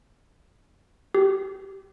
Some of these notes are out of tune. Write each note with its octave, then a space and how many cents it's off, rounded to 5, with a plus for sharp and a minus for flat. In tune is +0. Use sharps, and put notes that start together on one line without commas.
G4 -15